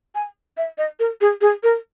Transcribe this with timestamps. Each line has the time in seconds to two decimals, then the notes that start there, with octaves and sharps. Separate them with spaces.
0.15 G#5
0.57 E5
0.78 D#5
0.99 A#4
1.21 G#4
1.41 G#4
1.63 A#4